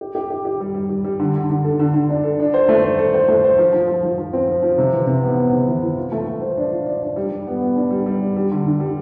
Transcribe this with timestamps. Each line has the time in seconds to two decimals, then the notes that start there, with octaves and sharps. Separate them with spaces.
0.01 G4
0.15 G4
0.30 G4
0.45 G4
0.60 G3
0.75 G3
0.89 G3
1.04 G3
1.19 D3
1.35 D3
1.50 D3
1.64 A4
1.79 D3
1.94 D3
2.09 D4
2.24 A4
2.40 D4
2.54 C5
2.69 A3
2.84 C5
2.99 A4
3.14 C5
3.28 A3
3.44 C5
3.58 F3
3.73 F3
3.88 F3
4.03 F3
4.18 F3
4.33 C4
4.48 F3
4.63 F3
4.78 C3
4.93 E3
5.07 C3
5.23 B3
5.38 B3
5.52 C3
5.67 E3
5.82 E3
5.97 F4
6.12 A3
6.27 A3
6.42 C5
6.57 D4
6.72 F4
6.87 D4
7.02 D4
7.16 G3
7.31 G3
7.47 B3
7.61 B3
7.76 D4
7.90 G3
8.06 G3
8.20 D4
8.36 G3
8.51 D3
8.66 D3
8.80 G3